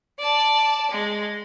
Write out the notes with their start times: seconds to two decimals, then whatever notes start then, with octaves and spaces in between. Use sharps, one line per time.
0.19 D5 A5
0.91 G#3